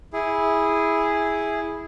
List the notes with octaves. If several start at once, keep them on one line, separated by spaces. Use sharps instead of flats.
E4 G#4